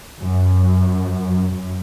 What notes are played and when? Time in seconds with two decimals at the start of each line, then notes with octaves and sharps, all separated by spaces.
0.20 F#2
1.53 F#2